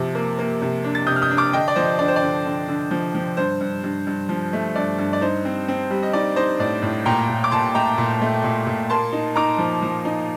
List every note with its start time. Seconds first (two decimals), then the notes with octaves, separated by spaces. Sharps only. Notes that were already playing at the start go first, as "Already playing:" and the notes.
Already playing: C3 F3
0.15 A#3
0.39 A#3
0.62 C3
0.84 D4
0.95 A6
1.07 C3 D#6 G6
1.16 F6
1.22 D#6 G6
1.30 D4
1.37 D6 F6
1.53 D3 D#5 G5
1.68 D5
1.76 F3 C5 D#5
1.99 D3 D5
2.08 C5
2.16 D5
2.22 D3
2.45 D3
2.68 D3
2.91 F3
3.15 F3
3.37 G2 C5
3.60 G2
3.84 G2
4.07 G2
4.29 F3
4.53 A3
4.76 G2 D5
4.98 G2
5.13 D5
5.21 D#4 C5
5.45 C4
5.68 C4
5.90 G3
6.03 D#5
6.13 D#4 D5
6.36 D#4 C5 D#5
6.59 A2 D5
6.83 A2
7.06 A#2 G5 A#5
7.29 A#2
7.44 D6
7.51 A#2 A5 C6
7.74 A3 G5 A#5
7.98 A#2
8.22 A3
8.44 A#2
8.66 A#2
8.90 A#3 A5 C6
9.13 D#4
9.36 D#4 A#5 D6
9.59 F3
9.83 F3
10.05 D#4